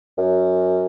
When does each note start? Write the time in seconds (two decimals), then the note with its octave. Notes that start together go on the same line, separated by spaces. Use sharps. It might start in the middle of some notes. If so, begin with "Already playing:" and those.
0.18 F#2